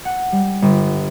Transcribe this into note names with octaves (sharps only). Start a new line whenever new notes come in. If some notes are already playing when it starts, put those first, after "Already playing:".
F#5
G3
G1